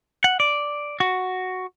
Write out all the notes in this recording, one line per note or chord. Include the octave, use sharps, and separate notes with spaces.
F#5
D5
F#4